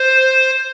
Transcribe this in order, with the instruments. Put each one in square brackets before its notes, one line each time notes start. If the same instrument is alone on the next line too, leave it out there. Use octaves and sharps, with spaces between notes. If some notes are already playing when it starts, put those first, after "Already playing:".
Already playing: [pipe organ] C5